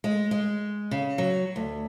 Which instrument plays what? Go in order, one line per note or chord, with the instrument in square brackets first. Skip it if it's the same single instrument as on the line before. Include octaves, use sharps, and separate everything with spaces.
[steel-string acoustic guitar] G#3
G#3
C#3
F#3
D2